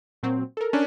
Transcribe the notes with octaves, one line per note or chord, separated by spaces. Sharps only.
A#2 F#3 C4
A4 A#4
C#4 D4